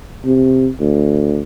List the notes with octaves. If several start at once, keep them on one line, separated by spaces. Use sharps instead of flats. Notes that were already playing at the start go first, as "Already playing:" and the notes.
C3
D2